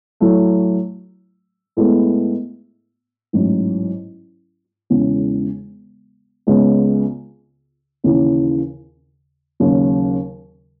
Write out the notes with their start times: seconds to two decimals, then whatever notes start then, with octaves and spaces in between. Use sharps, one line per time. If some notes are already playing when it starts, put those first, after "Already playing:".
0.20 A2 F#3 A3 E4
1.77 A2 G#3 B3 E4 A4
3.33 A1 G#2 F#3
4.90 E1 E2 C#3
6.47 C#2 C#3 G#3 B3
8.04 D#2 C#3 E3
9.60 D#2 C#3 F#3